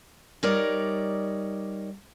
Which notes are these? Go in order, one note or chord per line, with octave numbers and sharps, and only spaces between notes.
G3 D#4 A#4 C#5 D5